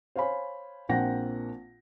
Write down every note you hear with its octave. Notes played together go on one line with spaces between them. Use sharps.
C5 C#5 F5 G#5 B5
A#1 A#3 C4 F#5 G5 A#6